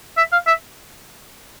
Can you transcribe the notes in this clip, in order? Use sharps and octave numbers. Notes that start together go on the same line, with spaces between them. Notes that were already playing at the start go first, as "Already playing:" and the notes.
E5
F5
E5